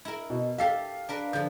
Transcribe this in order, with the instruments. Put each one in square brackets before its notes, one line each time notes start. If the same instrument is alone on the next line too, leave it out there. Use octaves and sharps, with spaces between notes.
[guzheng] E4 A#4
[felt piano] B2
[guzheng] G4 A4 E5 [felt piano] F5 C7
[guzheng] D4 A#4 B4
[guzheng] D3 F3 [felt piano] G6